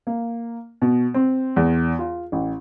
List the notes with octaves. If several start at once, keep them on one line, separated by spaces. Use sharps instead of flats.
A#3
B2
C4
E2
F4
A1